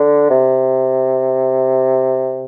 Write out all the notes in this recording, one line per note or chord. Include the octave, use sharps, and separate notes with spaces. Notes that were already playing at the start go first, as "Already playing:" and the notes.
Already playing: D3
C3